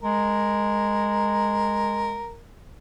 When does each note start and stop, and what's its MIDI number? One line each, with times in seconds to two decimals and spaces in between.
0.03 2.24 56
0.03 2.41 70